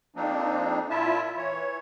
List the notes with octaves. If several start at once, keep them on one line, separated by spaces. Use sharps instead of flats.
F2 F3 A#3 C4 D4 D#4
A#2 E4 F4 E5 A5
E3 C#5